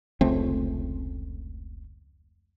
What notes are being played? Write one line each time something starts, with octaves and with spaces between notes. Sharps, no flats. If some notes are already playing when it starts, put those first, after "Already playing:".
F1 C#2 A3 C4